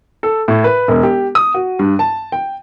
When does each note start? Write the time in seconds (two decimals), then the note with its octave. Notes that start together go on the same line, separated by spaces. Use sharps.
0.23 A4
0.48 A2
0.64 B4
0.88 E1
1.03 G4
1.35 D#6
1.54 F#4
1.79 G2
1.99 A5
2.32 G5